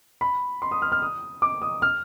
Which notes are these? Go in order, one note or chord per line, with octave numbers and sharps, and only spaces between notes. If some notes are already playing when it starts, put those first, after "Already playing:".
B5
C6
D#6
F6
F6
D#6
D6
D#6
F6